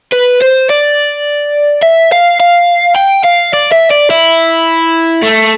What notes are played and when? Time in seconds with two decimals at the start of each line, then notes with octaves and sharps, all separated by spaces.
0.13 B4
0.42 C5
0.70 D5
1.82 E5
2.12 F5
2.40 F5
2.96 G5
3.25 F5
3.53 D5
3.72 E5
3.90 D5
4.10 E4
5.23 A3